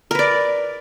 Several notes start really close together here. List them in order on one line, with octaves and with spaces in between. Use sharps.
A#4 B4 D5